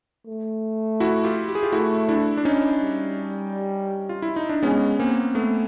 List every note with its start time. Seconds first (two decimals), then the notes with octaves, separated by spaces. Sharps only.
0.27 A3
1.00 E4 F#4
1.24 F4 G4
1.48 G4
1.55 G#4
1.63 F4 G4
1.72 A3 E4 F#4
2.09 D4 E4
2.37 D4
2.45 C#4 D#4
2.81 G3
4.09 F4
4.22 E4
4.36 D#4
4.49 D4
4.63 G#3 B3 C#4
4.99 A#3 C4
5.35 A3 B3